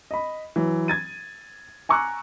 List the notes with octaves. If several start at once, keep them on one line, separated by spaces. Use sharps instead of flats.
D#5 B5
E3 F#3
G#6 A6 D#7
G#5 A#5 C#6 D6 E6 F#6